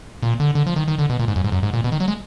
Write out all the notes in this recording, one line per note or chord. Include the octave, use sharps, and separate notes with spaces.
A#2
D3
D3
F3
D#3
D#3
D3
B2
A#2
G#2
F#2
G#2
F#2
G#2
A#2
B2
D#3
F#3
G#3